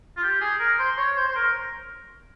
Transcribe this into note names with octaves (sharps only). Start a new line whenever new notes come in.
F4
G4
G#4
A#4
C5
C#5
C5
C5
A#4